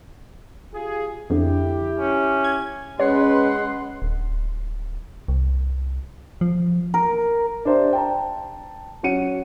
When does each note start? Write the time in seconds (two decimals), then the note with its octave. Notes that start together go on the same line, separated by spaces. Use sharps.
0.75 F4 G4 G#4
1.30 F2 D3 E4 G4
1.99 C#4
2.44 G#6
3.00 G#3 C#4 B4 C#5 F#5 C6
4.02 D1
5.28 C2
6.41 F3
6.94 A#4
7.65 D4 G4 C5 E5
7.93 G5 A5 A#5
9.03 F#3 C#4 F#5 C#7 D#7